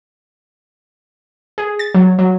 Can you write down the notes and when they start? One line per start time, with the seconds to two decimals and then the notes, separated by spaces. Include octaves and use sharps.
1.58 G#4
1.79 A6
1.95 F#3
2.19 F#3